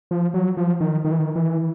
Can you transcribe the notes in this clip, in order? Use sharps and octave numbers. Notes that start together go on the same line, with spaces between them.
F3
F#3
F3
D#3
D#3
E3
D#3
E3